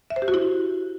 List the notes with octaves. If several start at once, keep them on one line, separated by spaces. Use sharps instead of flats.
E5
C5
G4
F#4
E4